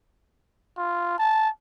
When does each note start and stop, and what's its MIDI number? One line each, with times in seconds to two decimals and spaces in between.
0.78 1.15 65
1.18 1.49 81